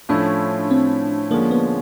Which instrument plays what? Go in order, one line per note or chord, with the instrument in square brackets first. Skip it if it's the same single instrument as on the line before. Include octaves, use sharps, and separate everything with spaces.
[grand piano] A2 F3 A3 C#4 E4 [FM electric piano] D4
[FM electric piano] C4
[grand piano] D3 F3 G#3 C#4 [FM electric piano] A#3
[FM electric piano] B3